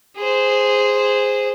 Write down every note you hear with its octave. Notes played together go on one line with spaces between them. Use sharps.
G#4 C5